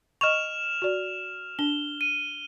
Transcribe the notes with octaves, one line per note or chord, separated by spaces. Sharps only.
D#5 C#6 F6 E7 F7
F#4 D5
D4 G7
D#7